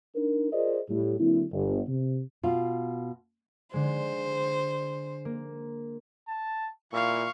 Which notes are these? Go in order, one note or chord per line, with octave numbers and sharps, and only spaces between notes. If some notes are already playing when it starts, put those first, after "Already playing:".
D4 D#4 A#4
F4 G#4 A#4 C5 D5 D#5
A2 G3
D3 F#3 A#3 C4 E4
G1
C3
B2 F4
D3 G#3 C5
A#3
A5
A#2 E4 F5 C#6